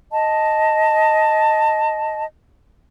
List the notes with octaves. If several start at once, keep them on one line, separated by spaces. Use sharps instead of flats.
D#5 A5